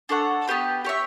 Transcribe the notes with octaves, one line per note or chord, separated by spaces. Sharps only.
D4 A4 C#5 F#5
B3 D4 G4 B4
G4 C#5 E5